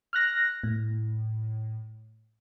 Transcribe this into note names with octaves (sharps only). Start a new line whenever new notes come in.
F6 F#6 A#6
A2